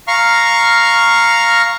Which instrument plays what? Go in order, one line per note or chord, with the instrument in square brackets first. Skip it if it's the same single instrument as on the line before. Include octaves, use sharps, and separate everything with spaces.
[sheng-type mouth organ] F5 A#5 C#6 F6